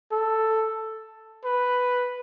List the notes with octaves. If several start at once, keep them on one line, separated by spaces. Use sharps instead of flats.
A4
B4